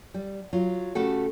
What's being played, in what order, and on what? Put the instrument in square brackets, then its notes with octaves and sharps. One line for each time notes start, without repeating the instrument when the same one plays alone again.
[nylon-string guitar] G3
F#3 F4
C#3 A3 F#4 G4 A4